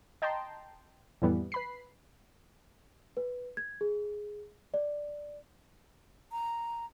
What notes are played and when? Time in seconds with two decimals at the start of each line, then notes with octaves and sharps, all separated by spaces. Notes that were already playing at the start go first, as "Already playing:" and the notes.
0.22 D#5 G5 A5 A#5 C6
1.22 F2 A2 E3 G3 B3
1.52 B4 B5 C7
3.17 B4
3.57 G#6
3.81 G#4
4.74 D5
6.32 A#5